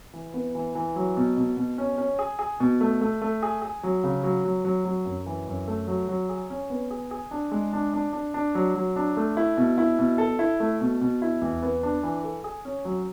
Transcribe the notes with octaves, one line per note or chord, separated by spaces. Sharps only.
E3
B3
E3
E3
F#3
B2
B2
B2
C#4
C#4
G#4
G#4
B2
A3
A3
A3
G#4
G#4
F#3
C#3
F#3
F#3
F#3
F#3
F#2
E3
F#2
A3
F#3
F#3
G#4
C#4
B3
G#4
G#4
D4
G#3
D4
D4
D4
D4
F#3
F#3
D4
A3
E4
B2
E4
B2
A4
E4
A3
B2
B2
E4
E2
B3
D4
E3
A4
G#4
C#4
F#3